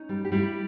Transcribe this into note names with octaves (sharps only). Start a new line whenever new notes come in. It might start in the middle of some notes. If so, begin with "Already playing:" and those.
Already playing: C#4 D#4
G3
G4
G3 E4